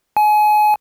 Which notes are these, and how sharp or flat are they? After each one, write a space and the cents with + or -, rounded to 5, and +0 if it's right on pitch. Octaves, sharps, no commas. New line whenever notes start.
G#5 +30